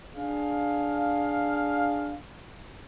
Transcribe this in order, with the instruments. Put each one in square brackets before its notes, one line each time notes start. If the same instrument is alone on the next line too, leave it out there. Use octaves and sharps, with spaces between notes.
[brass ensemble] D4 G#4 F5